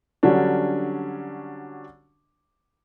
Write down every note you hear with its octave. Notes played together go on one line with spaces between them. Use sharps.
D3 F#3 G3 C#4 D4